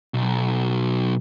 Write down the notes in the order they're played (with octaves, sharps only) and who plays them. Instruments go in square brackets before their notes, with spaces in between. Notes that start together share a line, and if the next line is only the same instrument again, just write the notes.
[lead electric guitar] B1